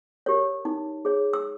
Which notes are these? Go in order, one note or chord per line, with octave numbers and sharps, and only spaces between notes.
G4 A#4 C#5
D#4
G#4 C#5
E6